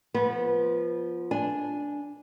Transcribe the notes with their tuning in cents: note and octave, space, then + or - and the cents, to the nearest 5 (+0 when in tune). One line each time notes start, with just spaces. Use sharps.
F3 +0 B3 -25
D4 -10 G#5 +0